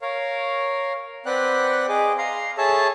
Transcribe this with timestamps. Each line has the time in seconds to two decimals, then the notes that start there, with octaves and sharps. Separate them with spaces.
0.02 A#4 C#5 F5
1.26 C4 B4 D5 F#5 G5 F#6
1.89 G#4 D#5 D6
2.18 F5 A#5 C6
2.58 G#4 A4 C#5 E5 A5